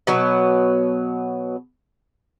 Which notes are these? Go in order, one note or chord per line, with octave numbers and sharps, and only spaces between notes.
B2 F#3 B3